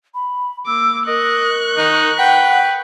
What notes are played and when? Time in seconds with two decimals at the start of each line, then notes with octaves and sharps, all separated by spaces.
0.14 B5
0.67 A#3 D6 E6
1.07 A#4 D#5 C#6 F#6
1.77 D#3 D#4
2.18 B4 F#5 G5